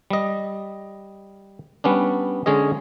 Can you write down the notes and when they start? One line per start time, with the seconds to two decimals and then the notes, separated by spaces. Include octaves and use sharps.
0.10 G3 D#5
1.84 G3 B3 C#4 D4
2.46 D3 G#3 C#4 G#4 D#5